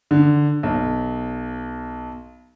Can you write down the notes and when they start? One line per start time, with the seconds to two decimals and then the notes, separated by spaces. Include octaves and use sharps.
0.11 D3
0.63 B1